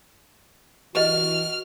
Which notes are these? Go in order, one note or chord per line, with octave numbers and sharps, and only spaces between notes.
E3 F#4 G4 B4 D#5 F6